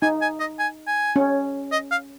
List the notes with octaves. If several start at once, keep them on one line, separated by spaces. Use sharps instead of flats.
D#4 G#5
G#5
D#5
G#5
G#5
C#4
D#5
F5